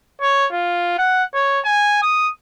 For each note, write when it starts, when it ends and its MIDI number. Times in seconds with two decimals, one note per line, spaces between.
0.21 0.46 73
0.52 0.97 65
0.98 1.23 78
1.34 1.60 73
1.65 2.01 80
2.02 2.31 87